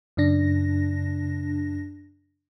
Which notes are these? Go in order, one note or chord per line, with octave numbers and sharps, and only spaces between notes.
F#2 C#3 D4 A#6